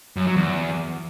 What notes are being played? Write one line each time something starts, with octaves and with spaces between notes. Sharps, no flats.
F#2
F#3
E2